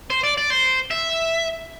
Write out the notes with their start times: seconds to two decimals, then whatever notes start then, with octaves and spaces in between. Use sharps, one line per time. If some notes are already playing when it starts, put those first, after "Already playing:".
0.10 C5
0.23 D5
0.37 D5
0.50 C5
0.91 E5